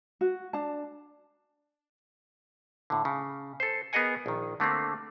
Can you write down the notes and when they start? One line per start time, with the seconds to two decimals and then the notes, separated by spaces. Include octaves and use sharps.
0.21 F#4
0.53 D4 A5
2.90 A2 D3
3.05 C#3
3.60 A4 C5
3.93 B3 G#4 A#4 D#5 F#5 G#5
4.26 A#1 D#3
4.60 D3 A3 A#3 C4